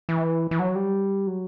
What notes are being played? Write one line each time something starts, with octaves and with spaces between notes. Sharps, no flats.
E3
E3
F#3
G3
F#3